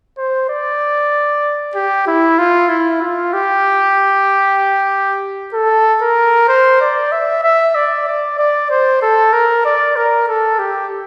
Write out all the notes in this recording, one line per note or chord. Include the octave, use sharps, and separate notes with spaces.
C5
D5
G4
E4
F4
E4
F4
G4
A4
A#4
C5
D5
E5
E5
D5
D5
D5
C5
A4
A#4
D5
A#4
A4
G4